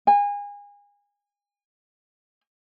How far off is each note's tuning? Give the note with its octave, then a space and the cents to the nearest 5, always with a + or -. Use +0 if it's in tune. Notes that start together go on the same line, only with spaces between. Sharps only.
G#5 -30